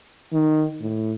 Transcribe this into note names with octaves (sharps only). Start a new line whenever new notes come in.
D#3
A2